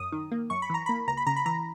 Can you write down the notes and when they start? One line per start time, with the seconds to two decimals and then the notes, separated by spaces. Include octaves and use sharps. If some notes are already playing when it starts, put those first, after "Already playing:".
Already playing: F#2 D#6
0.12 D#3
0.32 A#3
0.50 F#2 C#6
0.62 B5
0.70 E3 A#5
0.86 A#3 B5
1.08 C#2 A#5
1.17 B5
1.27 C#3 A#5
1.36 B5
1.46 E3 A#5